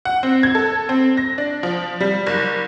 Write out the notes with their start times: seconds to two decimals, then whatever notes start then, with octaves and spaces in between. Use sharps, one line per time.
0.05 F#5
0.23 C4
0.43 G#6
0.55 A4
0.89 C4
1.17 A#6
1.38 D4
1.63 F3
2.01 G3
2.27 F#1